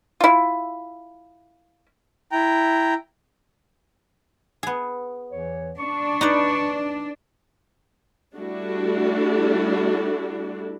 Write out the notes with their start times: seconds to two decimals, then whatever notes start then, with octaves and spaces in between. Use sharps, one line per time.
0.20 E4 F4
2.31 E4 G5 A#5
4.63 B3 G#4
5.32 E2 E3 C#5
5.79 D4 C#6
6.21 D#4 B4 D5
8.37 G3 A3 D4 E4 F#4 A4